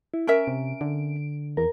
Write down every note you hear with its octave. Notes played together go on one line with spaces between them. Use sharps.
E4
C#4 A#4 E5 D7
C3
D3
E2 A#4